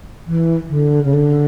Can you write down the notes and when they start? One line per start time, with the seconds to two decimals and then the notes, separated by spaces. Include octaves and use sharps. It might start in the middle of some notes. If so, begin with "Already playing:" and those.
0.26 E3
0.69 D3
1.04 C#3
1.13 D3